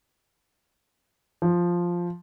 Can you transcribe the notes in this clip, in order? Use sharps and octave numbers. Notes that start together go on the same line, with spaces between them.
F3